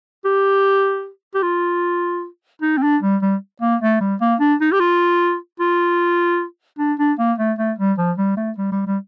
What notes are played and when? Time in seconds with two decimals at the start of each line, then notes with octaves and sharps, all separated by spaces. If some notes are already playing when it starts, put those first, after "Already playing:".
0.25 G4
1.34 G4
1.43 F4
2.62 D#4
2.77 C4
2.83 D4
3.02 G3
3.22 G3
3.62 A#3
3.81 A3
4.01 G3
4.21 A#3
4.40 D4
4.61 D#4
4.72 G4
4.80 F4
5.60 F4
6.79 D4
6.99 D4
7.19 A#3
7.38 A3
7.59 A3
7.78 G3
7.98 F3
8.18 G3
8.37 A3
8.58 G3
8.72 G3
8.87 G3